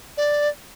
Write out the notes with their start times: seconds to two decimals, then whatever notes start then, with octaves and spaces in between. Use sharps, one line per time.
0.17 D5